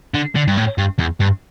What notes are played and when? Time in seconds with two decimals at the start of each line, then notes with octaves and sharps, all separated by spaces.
0.14 D3
0.35 D3
0.47 G2
0.57 A2
0.78 G2
0.99 E2
1.21 G2